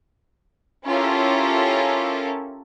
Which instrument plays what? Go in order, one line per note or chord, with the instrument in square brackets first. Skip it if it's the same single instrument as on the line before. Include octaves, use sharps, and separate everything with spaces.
[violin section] C#4 E4 F4 G4 A4 A#4